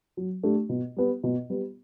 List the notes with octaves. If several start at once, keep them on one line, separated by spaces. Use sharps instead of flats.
F#3
A3 D4 G4
B2
G3 B3
B2
G3 B3